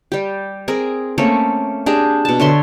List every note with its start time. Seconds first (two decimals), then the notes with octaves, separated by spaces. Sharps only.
0.12 G3 G4
0.68 C4 G#4 A#4
1.18 A3 A#3 C4 C#4
1.86 D4 G4 G#4 A#5
2.25 B2 A5
2.40 D3 C#5 E5 C6